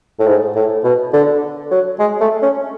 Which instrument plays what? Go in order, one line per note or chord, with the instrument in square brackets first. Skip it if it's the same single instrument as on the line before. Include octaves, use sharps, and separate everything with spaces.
[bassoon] A2
G#2
A2
B2
D3
F#3
G#3
A3
C#4